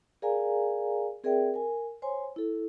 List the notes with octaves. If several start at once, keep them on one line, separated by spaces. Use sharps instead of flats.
G#4 A#4 D5 F5 G#5 A#5
C4 G#4 A#4 D5 E5 G5
A#4 G#5
C5 C#5 G#5 C6
E4 A4